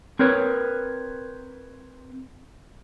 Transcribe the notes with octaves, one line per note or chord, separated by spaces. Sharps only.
C4 A#4 B4 C#5